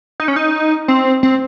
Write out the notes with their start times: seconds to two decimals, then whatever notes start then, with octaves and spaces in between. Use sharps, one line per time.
0.20 D#4
0.28 C#4
0.36 D#4
0.88 C4
1.23 C4